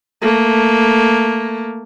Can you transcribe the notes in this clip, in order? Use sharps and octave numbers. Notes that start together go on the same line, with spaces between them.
A3 A#3